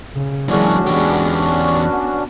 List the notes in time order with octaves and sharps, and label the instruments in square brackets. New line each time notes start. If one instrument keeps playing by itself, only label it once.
[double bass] C#3
[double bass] E3 G#3 [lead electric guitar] F#3 A#3 [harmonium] C#4 D4 F#4
[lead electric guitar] E2 G4 [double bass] G#3 B3
[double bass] B3